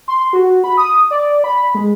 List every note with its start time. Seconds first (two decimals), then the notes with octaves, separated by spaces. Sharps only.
0.08 C6
0.33 F#4
0.64 B5
0.77 D#6
1.11 D5
1.44 B5
1.75 G#3